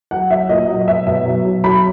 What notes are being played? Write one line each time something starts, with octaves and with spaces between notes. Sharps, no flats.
F#3 F#5
F#3 E5
A#2 D#5
F#3
B2 E5
B2 E5
F#3
F#3
F#3 B5